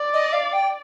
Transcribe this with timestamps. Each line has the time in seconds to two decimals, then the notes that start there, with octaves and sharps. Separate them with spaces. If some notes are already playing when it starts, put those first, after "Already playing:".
Already playing: D5
0.13 D#5
0.33 F5
0.53 G5